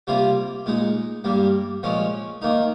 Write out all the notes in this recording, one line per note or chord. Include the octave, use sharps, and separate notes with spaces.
C3 G3 A#3 F4
A#2 G#3 D#4
G2 G3 A#3
A#2 F3 G#3 C#4
D#3 A#3 D#4